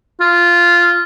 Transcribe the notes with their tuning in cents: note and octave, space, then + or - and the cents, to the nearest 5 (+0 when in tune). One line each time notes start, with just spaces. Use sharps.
F4 -10